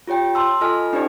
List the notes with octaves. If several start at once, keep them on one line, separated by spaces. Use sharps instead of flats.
F4 G4 C#5 G5
A5 C6 E6
F4 A4 D#5 G#5 F6
C#4 D#4 G4 A4 C5 D5